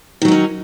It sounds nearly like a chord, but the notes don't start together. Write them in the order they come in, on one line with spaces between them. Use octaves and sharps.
D#3 F#3 D#4 C#4